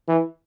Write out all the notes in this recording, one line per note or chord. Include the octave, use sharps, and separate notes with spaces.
E3